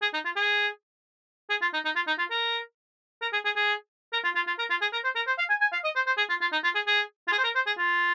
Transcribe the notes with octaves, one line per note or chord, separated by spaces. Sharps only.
G#4
D#4
F4
G#4
G#4
F4
D#4
D#4
F4
D#4
F4
A#4
A#4
G#4
G#4
G#4
A#4
F4
F4
F4
A#4
F4
G#4
A#4
C5
A#4
C5
F5
G#5
G#5
F5
D#5
C5
C5
G#4
F4
F4
D#4
F4
G#4
G#4
F4
G#4
C5
A#4
C5
G#4
F4